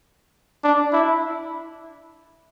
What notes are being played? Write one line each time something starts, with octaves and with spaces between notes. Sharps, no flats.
D4
E4